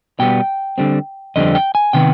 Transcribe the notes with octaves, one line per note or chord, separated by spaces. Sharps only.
B2 G3 B3 G5
D3 G3 C4
F2 D3 G3 C4 D#5
G5
G#5
C3 D#3 B3 G5